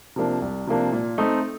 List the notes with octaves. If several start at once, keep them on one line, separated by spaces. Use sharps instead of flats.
C3 F3 A#3 D4
C2
C3 F3 A#3 D4
A#2
A3 C4 D#4